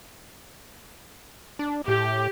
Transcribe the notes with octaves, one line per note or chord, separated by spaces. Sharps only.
D4
A2 G4